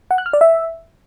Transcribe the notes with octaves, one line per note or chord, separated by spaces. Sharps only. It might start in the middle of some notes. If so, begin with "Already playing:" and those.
F#5
F#6
F6
D5
E5